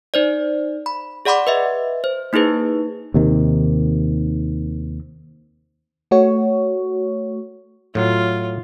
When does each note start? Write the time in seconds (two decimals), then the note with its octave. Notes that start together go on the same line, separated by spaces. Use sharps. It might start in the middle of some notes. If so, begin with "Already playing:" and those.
0.14 D#4 C5 D5
0.86 B5
1.25 G#4 D5 F#5 B5 C6 D6
1.47 B4 D#5 E5
2.04 C5
2.33 A#3 D#4 E4 G#4 B4
3.14 D#2 C3 D#3
6.11 A3 F#4 C#5
7.95 A2 F#3 F4